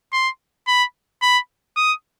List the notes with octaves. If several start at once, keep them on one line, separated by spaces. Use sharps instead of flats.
C6
B5
B5
D#6